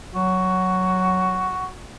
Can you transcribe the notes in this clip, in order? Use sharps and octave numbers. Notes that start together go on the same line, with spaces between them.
F#3 F#4